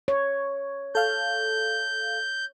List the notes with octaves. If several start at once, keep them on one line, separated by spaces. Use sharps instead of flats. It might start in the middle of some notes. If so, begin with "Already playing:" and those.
C#5
A4 F5 G6